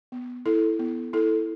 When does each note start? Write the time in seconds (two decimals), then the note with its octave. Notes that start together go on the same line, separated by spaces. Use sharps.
0.12 B3
0.46 E4 A4
0.79 B3
1.13 E4 A4